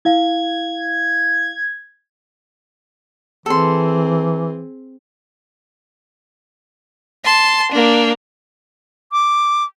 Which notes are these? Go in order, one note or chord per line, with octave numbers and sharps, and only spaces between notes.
E4 F5 G#6
E3 C4 G#4 A4 C6
A5 C6
A#3 D4
D6